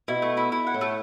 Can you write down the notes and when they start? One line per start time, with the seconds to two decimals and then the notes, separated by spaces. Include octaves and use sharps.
0.08 B2 E4
0.22 A3
0.37 E4
0.52 E4
0.67 F#5
0.74 A2
0.81 A3